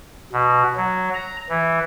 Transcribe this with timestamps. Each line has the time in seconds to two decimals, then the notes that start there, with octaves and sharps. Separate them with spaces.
0.33 B2
0.76 F#3
1.14 A#5
1.49 E3